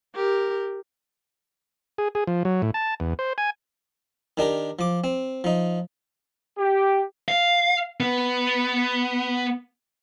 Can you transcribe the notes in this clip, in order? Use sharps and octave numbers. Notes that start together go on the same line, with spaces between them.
G4 A#4
G#4
G#4
F3
F#3
A2
A5
E2
C5
G#5
D#3 D4 G4 A#4
F3 D6
C4
F3 D#4
G4
F5
B3